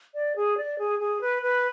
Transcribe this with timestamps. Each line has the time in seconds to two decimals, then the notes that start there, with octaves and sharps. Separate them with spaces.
0.15 D5
0.36 G#4
0.57 D5
0.79 G#4
1.00 G#4
1.21 B4
1.43 B4